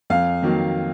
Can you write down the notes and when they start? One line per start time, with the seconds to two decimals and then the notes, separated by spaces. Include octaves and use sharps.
0.10 F2 F5
0.43 D#3 F#3 A#3